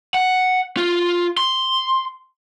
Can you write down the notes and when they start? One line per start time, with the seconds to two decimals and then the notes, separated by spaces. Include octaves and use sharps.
0.14 F#5
0.77 F4
1.37 C6